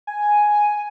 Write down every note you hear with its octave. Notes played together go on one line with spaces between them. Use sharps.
G#5